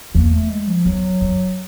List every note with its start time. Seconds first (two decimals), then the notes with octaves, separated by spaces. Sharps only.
0.15 E2 A#3
0.32 A3
0.50 G#3
0.67 F3
0.85 E2 F#3
1.21 F#2